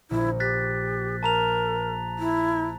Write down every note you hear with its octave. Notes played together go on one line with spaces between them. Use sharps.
A#1 E4
G4 F#6 A6 B6
A#4 A5 A#5 F7
E4